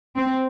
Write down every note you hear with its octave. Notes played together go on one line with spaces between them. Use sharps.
C4